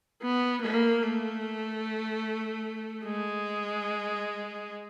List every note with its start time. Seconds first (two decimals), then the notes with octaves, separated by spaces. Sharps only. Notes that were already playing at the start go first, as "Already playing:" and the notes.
0.22 B3
0.62 A#3
1.03 A3
3.05 G#3